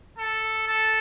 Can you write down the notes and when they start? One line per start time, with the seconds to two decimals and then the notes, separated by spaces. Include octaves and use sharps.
0.18 A4
0.68 A4